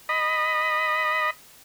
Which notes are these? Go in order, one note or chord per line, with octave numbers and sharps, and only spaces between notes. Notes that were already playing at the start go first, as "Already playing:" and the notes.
D#5 B5